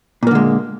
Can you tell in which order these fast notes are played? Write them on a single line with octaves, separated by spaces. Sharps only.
A#2 A#3 D3 G#3